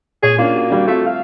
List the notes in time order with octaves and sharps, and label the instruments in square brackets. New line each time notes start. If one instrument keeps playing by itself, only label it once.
[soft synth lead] A#2 [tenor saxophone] G#4 [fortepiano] C#5
[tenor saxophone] A#3 [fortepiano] C#4 D4 F4
[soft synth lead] F#4
[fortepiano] G3 D4 [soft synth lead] F#4
[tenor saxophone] A3 [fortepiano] C4 F4 E5
[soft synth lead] F5